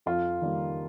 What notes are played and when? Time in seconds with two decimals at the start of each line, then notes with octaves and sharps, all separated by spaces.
0.06 F2 F4
0.41 D#3 G3 A#3